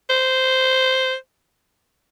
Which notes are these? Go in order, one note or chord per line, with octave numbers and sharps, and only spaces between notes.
C5